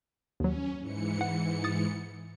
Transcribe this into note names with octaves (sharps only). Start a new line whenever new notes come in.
D#2 F#3 C#4
G#2 E3 C#7
F#5
D#6 A6